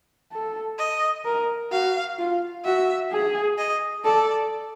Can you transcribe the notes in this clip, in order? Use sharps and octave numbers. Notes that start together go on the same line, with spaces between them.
A4
D#5
A#4
F#4 F5
F4
F#4 E5
G#4
D#5
A4 D5